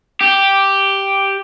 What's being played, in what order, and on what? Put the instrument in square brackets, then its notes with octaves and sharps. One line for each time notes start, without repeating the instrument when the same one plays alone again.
[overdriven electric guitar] G4